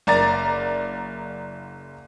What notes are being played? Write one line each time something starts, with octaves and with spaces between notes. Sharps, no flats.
F#1 D5 A#5 A6